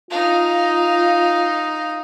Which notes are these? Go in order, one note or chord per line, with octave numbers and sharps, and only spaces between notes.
D#4 F4 F5